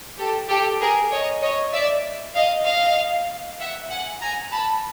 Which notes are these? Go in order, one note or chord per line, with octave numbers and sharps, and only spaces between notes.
G4 A4
G4 A4
G#4 A#4
C#5 D#5
C#5 D#5
D5 E5
D#5 F5
D#5 F5
E5 F#5
F#5 G#5
G#5 A#5
A5 B5